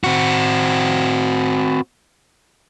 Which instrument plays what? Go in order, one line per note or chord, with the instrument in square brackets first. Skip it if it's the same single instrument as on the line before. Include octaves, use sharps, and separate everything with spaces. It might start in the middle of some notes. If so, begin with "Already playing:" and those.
[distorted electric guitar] C4 F#4